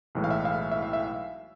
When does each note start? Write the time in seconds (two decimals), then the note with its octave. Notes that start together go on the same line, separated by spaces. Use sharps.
0.15 B1 A2 E3 G#3
0.24 F5
0.31 E5
0.45 F5
0.71 E5
0.82 F5
0.93 E5